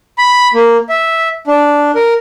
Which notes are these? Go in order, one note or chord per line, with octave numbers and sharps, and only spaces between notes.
B5
A#3
E5
D4
A#4